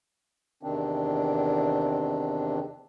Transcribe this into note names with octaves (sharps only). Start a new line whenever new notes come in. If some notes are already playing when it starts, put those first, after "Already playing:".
E2 C3 D#3 C4 D4